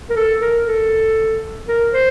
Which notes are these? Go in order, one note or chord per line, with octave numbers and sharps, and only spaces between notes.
A#4
A4
A#4
A4
A#4
C5